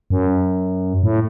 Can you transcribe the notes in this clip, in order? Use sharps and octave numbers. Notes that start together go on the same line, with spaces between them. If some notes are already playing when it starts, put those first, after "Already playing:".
F#2
A2